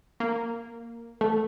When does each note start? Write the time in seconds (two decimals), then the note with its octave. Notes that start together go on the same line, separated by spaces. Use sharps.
0.20 A#3
1.21 A3